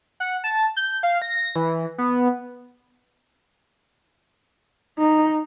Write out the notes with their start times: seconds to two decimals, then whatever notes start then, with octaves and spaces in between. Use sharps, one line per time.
0.20 F#5
0.44 A5
0.77 G6
1.03 F5
1.22 A#6
1.56 E3
1.98 B3
4.99 D#4